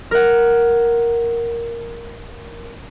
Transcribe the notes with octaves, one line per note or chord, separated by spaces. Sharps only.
A#4 F#5